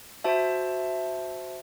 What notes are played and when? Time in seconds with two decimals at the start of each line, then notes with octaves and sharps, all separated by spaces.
0.24 F#4 C5 E5 A5